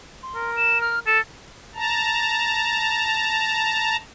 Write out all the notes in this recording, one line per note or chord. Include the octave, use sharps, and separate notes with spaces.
C6
A#4
E7
F6
A4 E7
A5 A#5